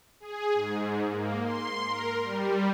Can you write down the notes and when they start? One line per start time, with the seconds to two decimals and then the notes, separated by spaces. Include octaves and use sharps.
0.20 G#4
0.54 G#2
1.09 A#3
1.43 C6
1.86 A#4
2.23 G3